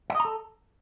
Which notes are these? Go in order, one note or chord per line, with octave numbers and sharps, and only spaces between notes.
E5
D#5
A#5
A4